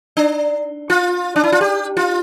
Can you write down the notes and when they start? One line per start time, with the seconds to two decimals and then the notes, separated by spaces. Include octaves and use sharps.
0.17 D4
0.90 F4
1.36 D4
1.43 E4
1.52 F4
1.61 G4
1.97 F4